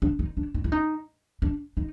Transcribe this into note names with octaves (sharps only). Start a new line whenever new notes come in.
D4
D#4
D4
D#4
E4
D#4
D4
D#4